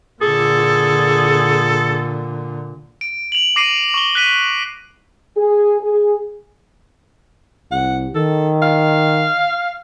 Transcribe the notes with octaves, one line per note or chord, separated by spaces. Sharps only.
A#2 D3 G#4 A4
D7
F7 F#7
D6 A#6 C7 D7 D#7
C#6 G7
F#6 B6 D#7
G#4
G#4
C2 F#5
D#3 A4
F5